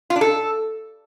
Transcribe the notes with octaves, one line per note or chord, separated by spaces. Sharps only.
F4
D4
A4